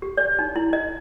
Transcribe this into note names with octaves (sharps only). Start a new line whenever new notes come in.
G4
D5
D#4
E4
D#5